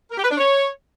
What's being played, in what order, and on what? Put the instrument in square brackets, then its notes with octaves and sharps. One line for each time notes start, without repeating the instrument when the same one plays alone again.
[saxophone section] A#4
G4
B4
D4
C#5